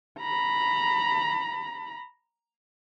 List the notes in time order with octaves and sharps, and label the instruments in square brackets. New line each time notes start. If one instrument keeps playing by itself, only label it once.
[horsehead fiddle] A#5 B5